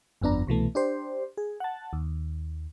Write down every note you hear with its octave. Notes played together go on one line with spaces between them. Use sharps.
G1 F2 B3 D4 A#5
C2 B2 E3 A3
D4 G4 C5
G#4
F#5 A5
D#2